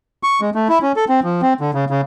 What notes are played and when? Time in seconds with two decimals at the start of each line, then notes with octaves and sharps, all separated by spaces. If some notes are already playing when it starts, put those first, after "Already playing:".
0.23 C#6
0.41 G#3
0.55 A3
0.69 E4
0.82 C#4
0.96 A4
1.09 C4
1.24 F3
1.42 C4
1.61 D3
1.74 C#3
1.90 C#3